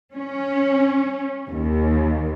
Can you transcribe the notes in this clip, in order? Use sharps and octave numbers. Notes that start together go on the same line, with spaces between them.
C#4
D#2